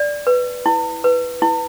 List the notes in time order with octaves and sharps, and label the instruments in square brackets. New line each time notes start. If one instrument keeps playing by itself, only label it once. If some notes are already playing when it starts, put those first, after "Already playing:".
Already playing: [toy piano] D5
B4
E4
B4
E4